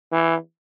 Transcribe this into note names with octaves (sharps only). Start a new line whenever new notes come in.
E3